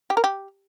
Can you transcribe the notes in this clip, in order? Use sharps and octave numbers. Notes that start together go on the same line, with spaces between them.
G4
A#4
G4